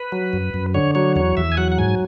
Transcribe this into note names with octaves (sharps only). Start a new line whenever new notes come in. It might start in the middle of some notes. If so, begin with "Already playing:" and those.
Already playing: B4
F#3
F#2
F#2
D3 C#5
F#3 C#5
E2 C#5
E2 E5
G#5
F#3 F#5
F#5
G#2 G#5